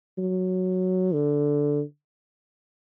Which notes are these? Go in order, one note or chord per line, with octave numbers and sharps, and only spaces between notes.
F#3
D3